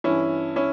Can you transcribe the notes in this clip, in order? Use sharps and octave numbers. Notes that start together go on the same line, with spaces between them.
G2 E3 C#4 E4
C#4 E4